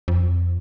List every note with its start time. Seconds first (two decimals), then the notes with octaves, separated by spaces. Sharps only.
0.08 F2